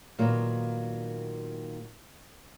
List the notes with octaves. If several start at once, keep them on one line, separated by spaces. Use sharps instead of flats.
A#2 D#3 F#3 A#3 B3